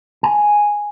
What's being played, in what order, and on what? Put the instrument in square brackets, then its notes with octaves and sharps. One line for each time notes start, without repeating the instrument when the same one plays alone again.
[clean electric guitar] G#5